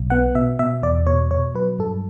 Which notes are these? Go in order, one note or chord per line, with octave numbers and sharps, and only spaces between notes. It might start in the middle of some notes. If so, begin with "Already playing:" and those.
Already playing: B1
B3 F#5
B2 E5
B2 E5
E2 D5
B2 C#5
B2 C#5
F#3 B4
G2 A4